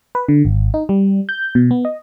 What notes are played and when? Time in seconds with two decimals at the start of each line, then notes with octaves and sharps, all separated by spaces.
0.15 B4
0.29 D3
0.45 G#1
0.74 D#4
0.89 G3
1.29 G6
1.55 B2
1.71 B3
1.85 D#5